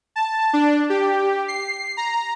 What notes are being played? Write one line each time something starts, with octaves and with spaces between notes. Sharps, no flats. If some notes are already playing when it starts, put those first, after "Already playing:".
A5
D4
G4
C7
A#5